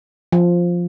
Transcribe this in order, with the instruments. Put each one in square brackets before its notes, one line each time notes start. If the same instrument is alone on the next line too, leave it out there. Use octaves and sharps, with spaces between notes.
[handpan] F3